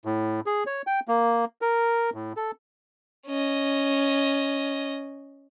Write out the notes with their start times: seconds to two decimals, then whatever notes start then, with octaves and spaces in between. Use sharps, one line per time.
0.05 A2
0.46 G#4
0.66 C#5
0.87 G5
1.08 A#3
1.61 A#4
2.14 A2
2.37 A4
3.27 C#4 D#5